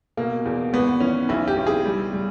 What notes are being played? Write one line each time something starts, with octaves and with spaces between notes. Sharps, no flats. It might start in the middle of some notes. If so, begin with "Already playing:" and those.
B2 A#3
E2
G#1 B3
E3 C#4
B1 E4
G4
B1
G#4
G3
G3